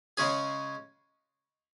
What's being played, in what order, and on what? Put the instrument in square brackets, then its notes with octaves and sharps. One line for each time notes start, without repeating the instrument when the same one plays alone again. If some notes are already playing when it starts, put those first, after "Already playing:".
[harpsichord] C#3 G#3 C#4 G#4